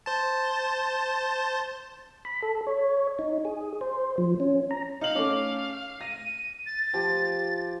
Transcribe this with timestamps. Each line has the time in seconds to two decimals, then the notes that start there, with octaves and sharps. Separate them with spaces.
0.06 C5 A5
2.25 B5
2.42 A4
2.67 C#5
3.19 D#4
3.45 G#4
3.81 C5
4.18 F3
4.40 C#4
4.71 A#5
5.01 D#4 F5 F#7
5.15 A3 C#4 D6
6.01 A#6 D#7
6.66 A6
6.94 F3 G4